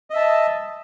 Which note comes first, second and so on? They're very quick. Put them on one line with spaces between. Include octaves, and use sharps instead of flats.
D#5 E5 A5